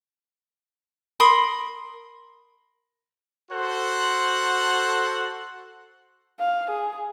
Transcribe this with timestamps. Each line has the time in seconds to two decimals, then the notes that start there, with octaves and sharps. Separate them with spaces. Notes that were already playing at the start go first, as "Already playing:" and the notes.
1.20 A#4 B5 C6 D#6
3.51 F#4 A4 C5 F#5
6.40 F5
6.70 G#4